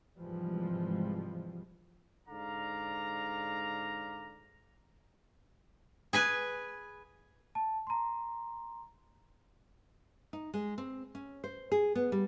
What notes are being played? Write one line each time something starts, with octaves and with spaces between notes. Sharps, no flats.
G#2 C3 E3 F3 G3 G#3
G#2 D3 D5 F5 A#5
G#4 B4 G#5
A5
A#5 C6
D#4
G#3
C4
C#4
C5
G#4
B3
G3